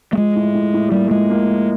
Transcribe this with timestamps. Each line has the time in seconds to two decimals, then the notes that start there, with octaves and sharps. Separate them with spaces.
0.13 A3
0.17 F3 G#3
0.36 A2
0.55 A2
0.74 A2
0.92 G3 A#3
1.10 F3 G#3
1.30 A#3
1.48 F3